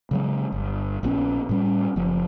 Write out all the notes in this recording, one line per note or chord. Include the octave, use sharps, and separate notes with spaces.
C#3 F#3 G#3
G1
A#1 A#2 B3 C#4
A2 G3 C#4
F#1 F3